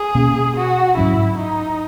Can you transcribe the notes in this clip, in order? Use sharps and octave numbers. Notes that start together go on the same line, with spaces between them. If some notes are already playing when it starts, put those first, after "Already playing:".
Already playing: G#4
B2 A#3 C#4
F#4
G#2 F#3 C#4 E4
D#4